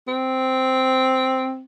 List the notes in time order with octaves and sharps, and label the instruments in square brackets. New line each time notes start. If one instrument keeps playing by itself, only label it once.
[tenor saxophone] C4